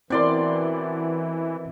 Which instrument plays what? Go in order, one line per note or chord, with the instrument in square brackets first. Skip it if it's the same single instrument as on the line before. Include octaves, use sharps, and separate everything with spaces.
[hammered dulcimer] B2 D5 C6 [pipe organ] E3 [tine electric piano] C4 E4 A#4